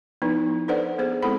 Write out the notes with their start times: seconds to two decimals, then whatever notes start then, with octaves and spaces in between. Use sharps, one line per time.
0.22 F3 B3 D#4 E4 B4
0.68 D4 A4 B4 C5 D5 F#5
0.98 B3 G#4 C5
1.22 G#3 C4 E4 A4 F#5 B5